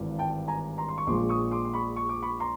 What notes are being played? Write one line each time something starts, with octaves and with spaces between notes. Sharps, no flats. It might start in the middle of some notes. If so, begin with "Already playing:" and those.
Already playing: G#1 G2 E3
G5 A5
G#5 A#5
A#5 C6
C6
C#6
A#1 A#2 F3 G#3 C6 D6
C#6 D#6
C6 D6
C6
B5 C#6
C#6
D6
B5 C#6
A#5 C6